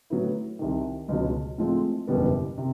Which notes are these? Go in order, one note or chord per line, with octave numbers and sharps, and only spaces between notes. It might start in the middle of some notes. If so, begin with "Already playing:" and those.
A2 F#3 B3 E4
C2 C3 D#3
C#2 B2 F#3
A2 F3 G#3 C4
F#1 E2 B2 G3 B3
C3